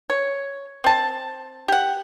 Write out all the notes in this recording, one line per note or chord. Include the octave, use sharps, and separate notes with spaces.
C#5
C4 A5
G4 F#5